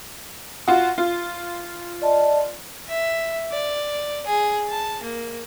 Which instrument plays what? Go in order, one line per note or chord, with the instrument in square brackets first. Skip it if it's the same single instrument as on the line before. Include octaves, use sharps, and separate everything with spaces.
[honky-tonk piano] F4 F#4
F4
[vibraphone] D5 D#5 A5
[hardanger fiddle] E5
D5
G#4
A5
A#3